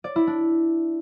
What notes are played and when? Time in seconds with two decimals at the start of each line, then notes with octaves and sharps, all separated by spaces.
0.04 D5
0.16 E4
0.27 D4